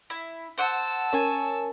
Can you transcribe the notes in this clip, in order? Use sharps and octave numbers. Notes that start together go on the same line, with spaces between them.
E4
C5 F#5 A5 E6
C#4 A#4 C#5 G#5 C#6